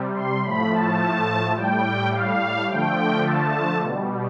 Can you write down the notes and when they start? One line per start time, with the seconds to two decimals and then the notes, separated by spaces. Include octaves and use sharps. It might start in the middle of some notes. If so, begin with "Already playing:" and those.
Already playing: C3 G3
0.14 C6
0.43 A2 F3 A3 B5
0.71 A5
1.56 A2 G3 G5
2.12 F5
2.69 D3 F3 A3 G5
3.25 A5
3.82 B2 G3